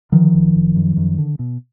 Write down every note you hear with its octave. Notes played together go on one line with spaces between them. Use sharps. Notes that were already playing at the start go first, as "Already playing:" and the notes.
D3 D#3 F3
F#1
F#1
F#2
F#2
D3
B2